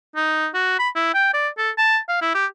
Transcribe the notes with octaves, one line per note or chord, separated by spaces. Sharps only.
D#4
F#4
B5
E4
G5
D5
A4
A5
F5
E4
G4